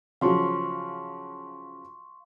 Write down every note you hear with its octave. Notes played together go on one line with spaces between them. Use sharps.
C#3 F3 F#3 F5 C6 C#6